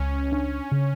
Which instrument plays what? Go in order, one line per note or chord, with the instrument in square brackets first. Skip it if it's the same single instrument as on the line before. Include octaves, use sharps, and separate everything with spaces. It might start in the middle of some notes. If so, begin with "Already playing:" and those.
Already playing: [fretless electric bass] C#2 [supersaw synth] C#4
[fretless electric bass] D4
C#3